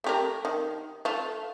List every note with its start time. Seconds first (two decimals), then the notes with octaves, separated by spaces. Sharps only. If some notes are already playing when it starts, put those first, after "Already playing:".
0.04 A3 G4 A#4
0.45 D#3
1.05 A3 F4